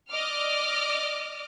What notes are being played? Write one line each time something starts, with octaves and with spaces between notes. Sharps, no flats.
D5 D#5 D6 F6